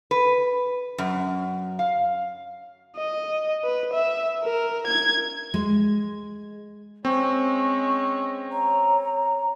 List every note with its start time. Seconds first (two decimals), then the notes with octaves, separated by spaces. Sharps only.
0.11 B4
0.98 F#2
1.79 F5
2.96 D#5
3.64 B4
3.93 E5
4.43 A#4
4.87 G#6
5.54 G#3
7.05 G#3 C4 C#4 C#6
8.51 C#5 A#5